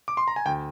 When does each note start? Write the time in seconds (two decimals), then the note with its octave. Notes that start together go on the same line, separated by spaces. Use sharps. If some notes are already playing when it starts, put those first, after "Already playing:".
0.08 D6
0.17 C6
0.28 A#5
0.36 G#5
0.46 D2 G5